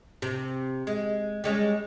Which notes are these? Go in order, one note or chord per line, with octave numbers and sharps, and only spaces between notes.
C3
G#3
G3 G#3 C#4